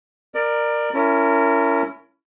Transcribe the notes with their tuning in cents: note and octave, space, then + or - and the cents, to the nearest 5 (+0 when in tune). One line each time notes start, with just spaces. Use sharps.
A#4 +0 D5 +25
C#4 +15 E4 +20 A#4 -25